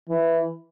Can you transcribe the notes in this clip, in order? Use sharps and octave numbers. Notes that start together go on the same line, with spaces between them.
E3